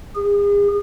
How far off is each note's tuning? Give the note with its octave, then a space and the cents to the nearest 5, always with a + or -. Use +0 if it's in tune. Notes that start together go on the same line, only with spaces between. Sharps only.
G#4 -40